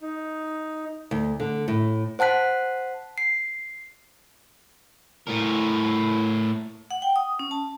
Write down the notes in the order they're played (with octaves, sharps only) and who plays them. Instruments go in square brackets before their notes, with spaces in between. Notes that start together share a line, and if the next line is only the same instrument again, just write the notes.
[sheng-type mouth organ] D#4
[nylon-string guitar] D2
D3
A2
[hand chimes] C5 F#5 A5 F#6 B6
C7
[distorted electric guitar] A2 A#4
[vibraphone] F#5
G5
D#6
C#4
A5